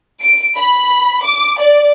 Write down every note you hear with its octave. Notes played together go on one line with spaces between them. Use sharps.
D7
B5
D6
D5